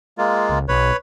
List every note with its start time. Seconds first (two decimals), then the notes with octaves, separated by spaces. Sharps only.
0.18 G#3 A#3 F4
0.50 C#2
0.68 B1 B4 C#5